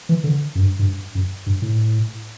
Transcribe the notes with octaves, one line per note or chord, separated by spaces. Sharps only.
E3
D3
F#2
G2
G2
F#2
G2
A2